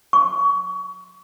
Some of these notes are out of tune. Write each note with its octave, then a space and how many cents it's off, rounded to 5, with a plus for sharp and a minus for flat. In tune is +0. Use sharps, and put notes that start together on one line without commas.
C#6 +30